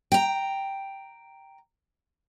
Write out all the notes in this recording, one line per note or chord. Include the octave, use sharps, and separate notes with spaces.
G5 A#5